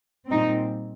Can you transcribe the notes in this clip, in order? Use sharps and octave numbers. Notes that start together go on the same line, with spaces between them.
A#2 G3 C4 D#4